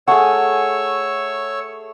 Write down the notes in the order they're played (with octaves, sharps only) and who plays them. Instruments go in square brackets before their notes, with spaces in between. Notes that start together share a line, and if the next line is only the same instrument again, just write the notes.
[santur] A3 G#4 [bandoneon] C#5 C#6 E6 [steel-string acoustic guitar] F#5